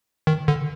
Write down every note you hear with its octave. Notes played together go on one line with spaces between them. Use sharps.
D#3
D3